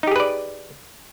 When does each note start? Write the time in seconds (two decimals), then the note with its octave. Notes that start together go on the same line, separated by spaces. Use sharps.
0.03 D#4
0.07 G4
0.12 G#4
0.16 B4
0.20 D5